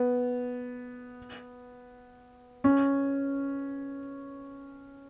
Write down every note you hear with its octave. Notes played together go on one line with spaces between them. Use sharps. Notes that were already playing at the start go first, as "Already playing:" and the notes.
Already playing: B3
C#4